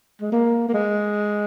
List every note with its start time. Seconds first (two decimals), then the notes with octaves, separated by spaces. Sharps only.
0.21 G#3
0.32 A#3
0.68 A#3
0.74 G#3